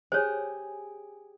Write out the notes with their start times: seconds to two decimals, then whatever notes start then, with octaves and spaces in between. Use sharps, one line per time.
0.12 G4 G#4 C5 C#5